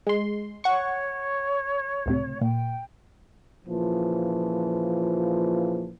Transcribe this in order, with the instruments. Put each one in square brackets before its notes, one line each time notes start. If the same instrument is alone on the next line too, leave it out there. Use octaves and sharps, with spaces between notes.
[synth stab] G#3 C6
[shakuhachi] C#5 [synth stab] F#5 C#6
[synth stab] C#2 A2 C3
[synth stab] A#2 [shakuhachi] G5
[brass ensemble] A#2 C#3 E3 F3